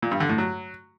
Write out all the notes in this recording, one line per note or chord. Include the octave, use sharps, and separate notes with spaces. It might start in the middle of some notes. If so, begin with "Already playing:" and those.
A#2
G2
D3
A2
F#3